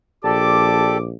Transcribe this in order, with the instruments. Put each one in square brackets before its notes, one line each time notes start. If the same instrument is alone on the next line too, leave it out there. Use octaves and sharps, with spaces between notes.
[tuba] A#1 [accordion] G4 A4 D5 [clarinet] A5 [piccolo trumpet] D6